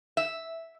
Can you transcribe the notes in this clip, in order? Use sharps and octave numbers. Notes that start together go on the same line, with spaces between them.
E5